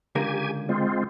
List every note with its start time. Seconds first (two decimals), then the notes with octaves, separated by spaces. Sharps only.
0.15 C#2 D3 G4 A#4 G#5
0.69 G#3 C4 F4